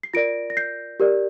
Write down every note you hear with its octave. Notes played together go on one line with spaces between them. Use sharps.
C7
F4 A#4 D5 A#6 D7
A#6
G6 C7
G4 A#4 D5